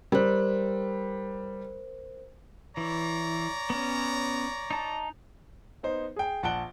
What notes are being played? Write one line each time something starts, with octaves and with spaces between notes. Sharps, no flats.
G3 A#4 C5
E3 C#5 D5 A#5
B3 C#4
D#4 A5
B3 D#4 C5
G#4 G5
A#1 F#5 A5 F#6 D7 G7